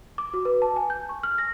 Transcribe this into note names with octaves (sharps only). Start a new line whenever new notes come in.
D6
F#4
B4
A5
G#5
G6
C#6
F6
A#6